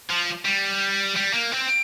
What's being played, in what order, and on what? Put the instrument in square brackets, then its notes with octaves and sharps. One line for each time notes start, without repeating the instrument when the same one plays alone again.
[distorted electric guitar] F3
G3
G3
A#3
C4